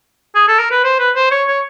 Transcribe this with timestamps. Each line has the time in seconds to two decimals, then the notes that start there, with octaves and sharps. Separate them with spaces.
0.35 G#4
0.48 A4
0.59 A#4
0.71 B4
0.84 C5
0.99 B4
1.15 C5
1.31 C#5
1.48 C#5